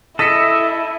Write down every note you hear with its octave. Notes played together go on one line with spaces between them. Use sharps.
E4 A4 D#5 E6 B6 C#7